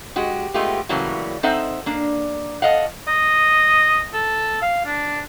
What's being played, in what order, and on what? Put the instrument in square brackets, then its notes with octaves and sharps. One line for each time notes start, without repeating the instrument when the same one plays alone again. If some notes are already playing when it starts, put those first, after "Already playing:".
[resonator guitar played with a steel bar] G#3 F#4 G4
G#3 A3 B3 F4 G4
A2 C#3 E3 F#3 G3 A#3
C4 D#4 A4 C5 E5 F#5
A#3 D4
A4 D#5 F5 F#5
[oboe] D#5
A4
F5
D4